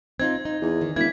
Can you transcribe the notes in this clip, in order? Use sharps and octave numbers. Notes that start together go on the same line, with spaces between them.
C4 D#4 F4 G#6
D#4
E2
D#3
E1 A#3 E4 G#6 B6